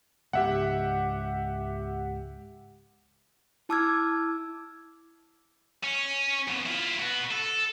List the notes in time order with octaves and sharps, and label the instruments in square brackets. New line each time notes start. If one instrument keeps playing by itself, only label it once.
[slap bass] C#2 G#2 [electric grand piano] G4 E5 F#5
[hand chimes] E4 A5 D6 E6 F6 G#6
[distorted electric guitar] C#4
F2 B2
E4 F4
F#4 B4
A4